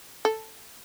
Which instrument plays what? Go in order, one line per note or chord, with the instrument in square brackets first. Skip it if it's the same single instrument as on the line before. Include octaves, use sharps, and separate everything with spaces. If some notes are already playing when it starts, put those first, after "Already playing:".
[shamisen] A4